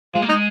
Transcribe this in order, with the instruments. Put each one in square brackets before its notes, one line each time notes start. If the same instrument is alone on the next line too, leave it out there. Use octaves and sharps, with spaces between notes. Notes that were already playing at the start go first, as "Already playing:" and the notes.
[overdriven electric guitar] G#3 [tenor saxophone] F4
[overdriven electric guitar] A#3
[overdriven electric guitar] G#3 [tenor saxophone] D#4